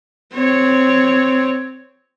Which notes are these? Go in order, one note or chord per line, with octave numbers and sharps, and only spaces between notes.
C4 C#5